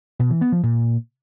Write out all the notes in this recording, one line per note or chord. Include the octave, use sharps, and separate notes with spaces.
B2
E3
B3
F3
A#2